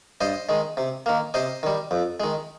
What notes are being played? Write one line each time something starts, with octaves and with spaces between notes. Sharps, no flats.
G2 C5 D#5
D#3 G#3
C3
D#3 A#3
C3 C5 D#5
D#3 G3
F2
D#3 G#3